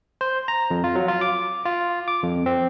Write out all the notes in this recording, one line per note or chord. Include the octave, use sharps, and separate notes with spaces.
C5
A#5
F2
F4
F#3
F4
D6
F4
D6
F2
C4